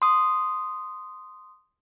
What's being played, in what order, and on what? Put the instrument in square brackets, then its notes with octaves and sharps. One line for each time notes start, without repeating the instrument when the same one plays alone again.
[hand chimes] C6 D#6